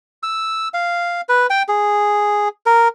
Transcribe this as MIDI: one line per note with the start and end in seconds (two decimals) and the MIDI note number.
0.23 0.68 88
0.74 1.21 77
1.29 1.47 71
1.50 1.62 79
1.68 2.48 68
2.66 2.88 70